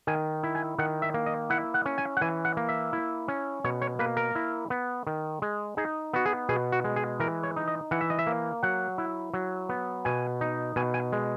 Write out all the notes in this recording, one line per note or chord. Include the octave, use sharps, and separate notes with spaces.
D#3 G#5
E4
G#5
D#3 F#5
E5
A#3
D#5
E4 F#5
F#5
C#4
G#5
F#5
E3 G#5
F#5
A#3
E5
E4
C#4
B2 C#5
C#5
A#3 B4
A#4
E4
B3
D#3
G#3
D#4 G#4
B3 F#4
G#4
B2 G#4
F#4
G#3
G#4
E3 A#4
C#5
D#4
D#5
E3 F#5
E5
D#5
E5
A#3
F#3 F#5
E4
F#3
B3
B2 G#5
D#4
B2 G#5
G#5
G#3